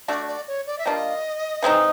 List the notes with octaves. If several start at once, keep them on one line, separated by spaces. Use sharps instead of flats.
A3 D4 F#4 D5
D5
C#5
D5
E5
G3 A#3 D4 F4 D#5
E3 G#3 C4 D#4